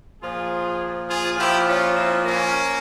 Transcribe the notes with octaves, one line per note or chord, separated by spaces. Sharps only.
A#2 F3 F4 G#4
F4 G#4
A#2 F3 E4 G4
C#4 F4
C4 E4
A#3 C#4